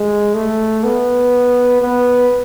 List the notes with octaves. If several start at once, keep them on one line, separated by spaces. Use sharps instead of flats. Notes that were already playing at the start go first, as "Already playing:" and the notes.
Already playing: G#3
A3
B3
B3